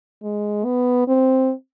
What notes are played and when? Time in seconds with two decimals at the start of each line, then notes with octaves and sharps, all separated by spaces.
0.23 G#3
0.65 B3
1.08 C4